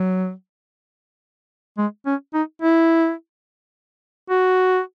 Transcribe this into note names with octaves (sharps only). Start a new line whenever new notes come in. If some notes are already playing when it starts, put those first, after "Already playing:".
Already playing: F#3
G#3
C#4
D#4
E4
F#4